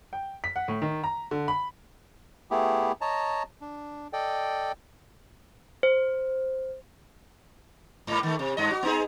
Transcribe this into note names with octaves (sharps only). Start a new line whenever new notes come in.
G5
B6
F#5
A2
D#3
A#5
D3
B5
A3 B3 E4 G4 G#4
C#5 D#5 A5 A#5
D4
A4 D5 D#5 G5
C5
G#2 A#3
D#3 A3
C3
G2 D#5
F#4
B3 D#4 G#4